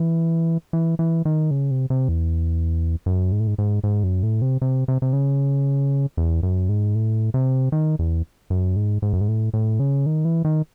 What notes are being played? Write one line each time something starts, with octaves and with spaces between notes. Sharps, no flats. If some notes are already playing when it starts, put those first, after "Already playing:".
Already playing: E3
E3
E3
D#3
C#3
C3
C3
E2
F#2
G#2
A2
G#2
G#2
G#2
F#2
A2
C3
C3
C3
C3
C#3
E2
F#2
G#2
A2
C3
D#3
E2
F#2
G#2
G#2
F#2
G#2
A2
A2
C#3
D#3
E3
D#3